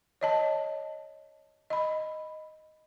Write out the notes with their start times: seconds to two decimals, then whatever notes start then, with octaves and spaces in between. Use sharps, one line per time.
0.21 C#5 D#5 A5
1.70 D#5 B5